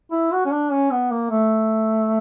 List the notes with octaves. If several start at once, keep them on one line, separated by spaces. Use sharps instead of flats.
E4
F#4
C#4
D4
C#4
B3
A#3
A3